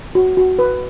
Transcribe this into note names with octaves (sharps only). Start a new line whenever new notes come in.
F#4
F#4
B4